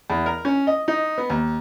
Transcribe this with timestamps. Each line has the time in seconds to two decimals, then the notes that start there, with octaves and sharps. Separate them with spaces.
0.10 E2
0.26 A#4
0.45 C#4
0.67 D#5
0.88 D#4
1.18 B3
1.30 D#2